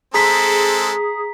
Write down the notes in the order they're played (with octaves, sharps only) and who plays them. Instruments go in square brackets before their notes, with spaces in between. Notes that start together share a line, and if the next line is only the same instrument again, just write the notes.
[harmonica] G#3 C4 A4 [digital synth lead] G#4 [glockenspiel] A#5 B6